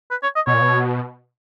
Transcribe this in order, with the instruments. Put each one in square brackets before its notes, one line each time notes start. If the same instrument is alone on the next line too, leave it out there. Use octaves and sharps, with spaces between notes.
[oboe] B4
C#5
D#5
[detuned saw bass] B2 [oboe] C#5
[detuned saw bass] A#2
B2